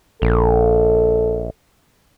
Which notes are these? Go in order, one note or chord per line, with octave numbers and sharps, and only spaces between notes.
A#1 A4